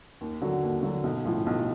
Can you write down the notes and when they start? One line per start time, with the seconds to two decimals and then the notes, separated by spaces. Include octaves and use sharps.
0.21 D#2
0.42 D3 F#3
0.63 D#2
0.83 D3 F#3
1.03 B1
1.25 A2 F3
1.46 B1